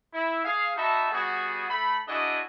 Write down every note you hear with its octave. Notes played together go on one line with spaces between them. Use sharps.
E4
G#4 F5
D#4 F#4 E5 A5 B5
G3 B3 F#4 G#4
A3 B5
D4 E4 F#4 G#4 D#5